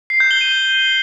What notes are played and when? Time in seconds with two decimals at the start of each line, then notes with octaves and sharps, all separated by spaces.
0.10 C7
0.20 G6
0.31 G7
0.41 D#7